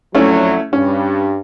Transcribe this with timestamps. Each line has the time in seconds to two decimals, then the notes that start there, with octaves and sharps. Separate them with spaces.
0.15 F2 D3 F#3 A3 C#4 E4
0.73 G2 C#4